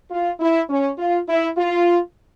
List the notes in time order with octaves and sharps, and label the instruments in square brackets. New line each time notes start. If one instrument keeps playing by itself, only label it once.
[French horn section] F4
E4
C#4
F4
E4
F4